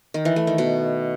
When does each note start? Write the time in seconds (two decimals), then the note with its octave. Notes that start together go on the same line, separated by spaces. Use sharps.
0.14 D#3
0.25 E3
0.36 A3
0.47 D#3
0.58 B2